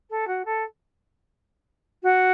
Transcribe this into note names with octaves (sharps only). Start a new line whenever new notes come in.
A4
F#4
A4
F#4